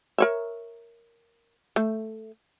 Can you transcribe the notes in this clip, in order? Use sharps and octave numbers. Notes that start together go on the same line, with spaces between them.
A#4 C#5 E5
A3